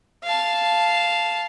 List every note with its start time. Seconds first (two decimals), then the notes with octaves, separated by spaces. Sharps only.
0.23 F5 A5